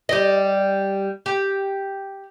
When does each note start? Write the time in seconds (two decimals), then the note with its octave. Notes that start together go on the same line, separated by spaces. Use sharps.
0.09 G3 D#5
1.26 G4